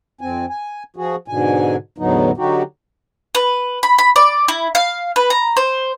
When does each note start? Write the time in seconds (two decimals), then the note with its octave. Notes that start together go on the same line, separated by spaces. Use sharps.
0.21 F2 C4 G#5
0.50 G#5
0.96 F3 F#4 G#4
1.28 G#2 B2 D3 G#5
1.98 E2 A2 D3 F#3 B3 D#4
2.37 D3 F#3 D#4 F#4 G4
3.35 B4
3.83 B5
3.98 B5
4.16 D5
4.48 E4
4.75 F5
5.16 B4
5.30 A#5
5.57 C5